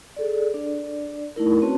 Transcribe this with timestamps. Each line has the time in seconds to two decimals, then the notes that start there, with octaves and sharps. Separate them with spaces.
0.16 G#4 A4 D5
0.54 D4 D5
1.36 A3 D#4 E4 A#4
1.62 C4 C#4 F#4 B4 C#5 A5